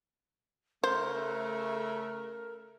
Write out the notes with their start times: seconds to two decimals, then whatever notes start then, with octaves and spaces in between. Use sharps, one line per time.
0.84 C#3 A3 A#4 C5